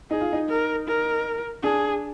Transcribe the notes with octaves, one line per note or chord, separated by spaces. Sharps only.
D#4 G#4
F4
D#4
A#4
A#4
D4 G#4